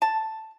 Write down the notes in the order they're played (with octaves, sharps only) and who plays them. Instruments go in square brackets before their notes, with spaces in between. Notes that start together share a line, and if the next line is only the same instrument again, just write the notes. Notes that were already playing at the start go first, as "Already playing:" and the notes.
[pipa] A5